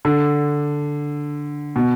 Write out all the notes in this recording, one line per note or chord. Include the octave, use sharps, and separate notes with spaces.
D3
B2